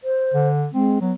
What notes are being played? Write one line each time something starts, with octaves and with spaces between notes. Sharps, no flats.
C5
D3
G#3 C4
F#3 B3